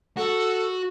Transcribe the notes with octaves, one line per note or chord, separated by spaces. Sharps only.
F#4 A4